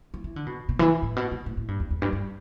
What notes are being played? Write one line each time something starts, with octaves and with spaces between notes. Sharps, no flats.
E3
E3
D3
B2
B2
E3
A2
B2
B2
A2
A2
G2
E2
E2
G2
G2